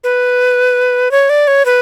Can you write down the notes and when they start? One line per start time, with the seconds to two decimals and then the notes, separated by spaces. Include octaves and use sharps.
0.04 B4
1.11 C#5
1.30 D5
1.47 C#5
1.65 B4